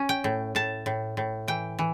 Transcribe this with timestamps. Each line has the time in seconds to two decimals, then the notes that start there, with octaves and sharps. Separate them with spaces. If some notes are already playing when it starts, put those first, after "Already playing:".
Already playing: C#4
0.09 G5
0.24 A2
0.55 A2 A5
0.86 A2
1.17 A2
1.48 E3 G5
1.79 E3